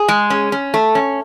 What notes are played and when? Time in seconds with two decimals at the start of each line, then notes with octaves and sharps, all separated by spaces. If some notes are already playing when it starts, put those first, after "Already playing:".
Already playing: G#4
0.08 G#3
0.30 C#4
0.52 C#4
0.74 A3
0.95 C#4